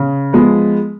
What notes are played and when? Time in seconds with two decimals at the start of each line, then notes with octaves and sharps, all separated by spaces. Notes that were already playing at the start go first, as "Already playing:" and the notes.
Already playing: C#3
0.33 F3 G#3 B3